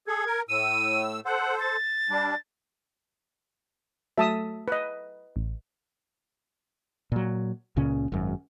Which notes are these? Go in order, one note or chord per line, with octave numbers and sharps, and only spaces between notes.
G#4 A4 G#6
A#4
A2 E6 D#7
A4 C5 F#5
A6
G3 D4
F#3 A3 E5 A5 D#6
B4 D#5
A1
A#2 F#3
C#2 A#2 C#3 C#4
G#1 F#2